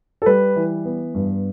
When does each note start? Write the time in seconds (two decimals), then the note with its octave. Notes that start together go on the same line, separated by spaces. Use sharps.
0.22 A4
0.26 G3 B4
0.56 E3
0.85 B3
1.15 G2